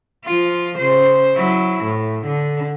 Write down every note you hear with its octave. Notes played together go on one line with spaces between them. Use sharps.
F3 F4
C#3 C5
F#3 E4
A2
D3